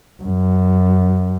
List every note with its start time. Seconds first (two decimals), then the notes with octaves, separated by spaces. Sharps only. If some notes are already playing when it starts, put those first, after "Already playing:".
0.23 F#2